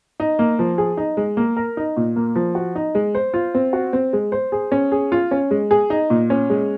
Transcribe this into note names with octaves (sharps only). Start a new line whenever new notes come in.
D#4
A#3
F3
G#4
D#4
G#3
A#3
A#4
D#4
A#2
A#3
F3
F#4
D#4
G#3
C5
F4
C4
F#4
C4
G#3
C5
G#4
C#4
G#4
F4
C#4
G#3
G#4
D#4
A#2
C#4
G#3